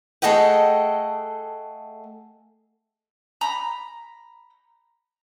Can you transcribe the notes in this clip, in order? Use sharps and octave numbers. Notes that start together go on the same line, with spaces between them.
A3 G#4 A4 D#5 F#5 G5
A#5 B5